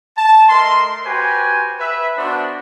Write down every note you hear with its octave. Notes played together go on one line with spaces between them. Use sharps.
A5
A3 A#4 D#5 C6
F#4 G4 B4 C5 G5 G#5
B4 E5
B3 D4 F#4 C5